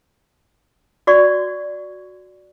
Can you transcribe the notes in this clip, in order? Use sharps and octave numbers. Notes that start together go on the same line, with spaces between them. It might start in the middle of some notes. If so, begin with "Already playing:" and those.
F#4 D5 C#6